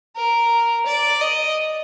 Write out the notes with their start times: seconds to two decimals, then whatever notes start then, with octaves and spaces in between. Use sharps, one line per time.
0.16 A#4
0.86 D5
1.21 D#5